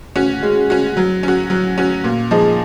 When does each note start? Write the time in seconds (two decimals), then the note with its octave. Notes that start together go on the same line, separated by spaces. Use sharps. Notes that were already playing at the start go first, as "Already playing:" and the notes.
0.16 C#4 F#4
0.43 G#3
0.70 C#4 F#4
0.97 F#3
1.23 C#4 F#4
1.50 F#3
1.78 C#4 F#4
2.04 A#2
2.31 F3 G#3 D#4 G#4